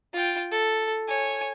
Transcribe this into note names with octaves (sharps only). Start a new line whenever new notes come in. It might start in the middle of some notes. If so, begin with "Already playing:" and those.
F4 G5
A4
C#5 G#5